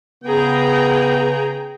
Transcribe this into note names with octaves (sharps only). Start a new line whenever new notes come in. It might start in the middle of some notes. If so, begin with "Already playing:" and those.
C#3 B3 G#4 G5 A#5